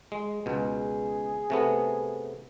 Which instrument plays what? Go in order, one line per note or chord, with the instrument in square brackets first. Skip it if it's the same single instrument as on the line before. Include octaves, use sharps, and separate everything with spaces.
[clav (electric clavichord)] G#3
[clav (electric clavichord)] C#2 B2 [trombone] G#4
[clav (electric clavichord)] C3 A3 B3